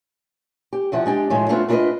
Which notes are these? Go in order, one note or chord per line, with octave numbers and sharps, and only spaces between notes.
G4
E2 C3 F3 F#5
G#3 D4 G4
A2 D#3 F3 G#3
A3 B3 C4 D4 F4 F#4
D4 E4 F4 A4 B4 D#5